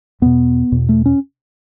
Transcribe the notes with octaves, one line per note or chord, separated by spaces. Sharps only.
E2 B2 B3
E2 B2
A3
C#4